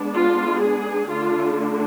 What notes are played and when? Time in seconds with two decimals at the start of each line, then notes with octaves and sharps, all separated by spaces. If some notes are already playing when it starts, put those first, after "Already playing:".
Already playing: G#3 B3 D4
0.13 F4
0.62 G#4
1.09 D3 A3 D4 F4